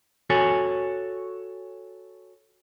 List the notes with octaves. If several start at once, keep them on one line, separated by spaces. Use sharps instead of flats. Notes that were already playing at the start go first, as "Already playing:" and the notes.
F#4 A4 C#5 G#5